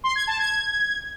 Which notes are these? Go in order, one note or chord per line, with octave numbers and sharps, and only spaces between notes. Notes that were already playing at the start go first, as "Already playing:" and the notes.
C6
G#6
A5
G#6